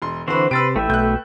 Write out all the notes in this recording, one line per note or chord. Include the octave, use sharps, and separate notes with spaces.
E1 C6
D3 E3 C4 F#4 B4 C5
C3 B4 C6 E6 A6 D7
A1 A3 B4 E5 G5
B1 F#6 G6